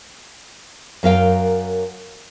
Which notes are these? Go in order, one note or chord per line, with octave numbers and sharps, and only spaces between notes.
F#2 A#4 F5 G5